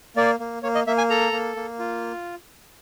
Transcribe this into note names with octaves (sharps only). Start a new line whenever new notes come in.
A#3 D5
A#3
A#3 C#5
D#5
A#3 E5
G#5
A4 A#5
A#3
A#3
F4